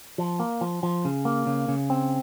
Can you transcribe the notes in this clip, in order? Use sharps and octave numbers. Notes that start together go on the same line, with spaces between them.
F3
A#3
F3
F3
C#3
A#3
C#3
C#3
C4